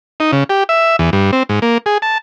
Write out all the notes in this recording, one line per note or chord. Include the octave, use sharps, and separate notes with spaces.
D#4
C#3
G4
E5
E2
G2
C4
G#2
A#3
G#4
A5